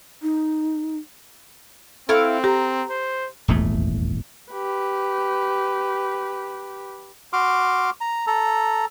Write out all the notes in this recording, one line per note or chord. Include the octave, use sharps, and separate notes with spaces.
D#4
C4 E4 A4 F5 C#6
G4 A#5
C5
D#1 G#1 E2 A3
G4 B4
F#4 C6 D6 F6
A#5
A4 A#5